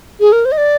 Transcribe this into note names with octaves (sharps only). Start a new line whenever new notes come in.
G#4
A#4
C5
D#5
D5